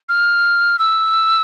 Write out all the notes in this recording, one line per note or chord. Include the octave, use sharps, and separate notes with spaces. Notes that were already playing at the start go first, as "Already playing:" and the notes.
F6
E6